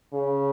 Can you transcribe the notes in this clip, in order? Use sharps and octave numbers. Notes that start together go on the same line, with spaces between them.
C#3